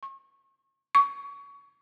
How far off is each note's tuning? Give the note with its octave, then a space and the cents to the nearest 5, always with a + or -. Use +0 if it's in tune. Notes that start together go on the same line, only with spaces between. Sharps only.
C#6 -35
C#6 +20